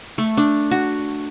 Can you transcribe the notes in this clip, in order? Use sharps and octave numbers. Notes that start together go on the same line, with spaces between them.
A3
D4
F#4